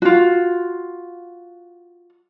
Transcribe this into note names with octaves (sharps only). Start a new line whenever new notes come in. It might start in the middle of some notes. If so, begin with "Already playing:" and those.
F4 F#4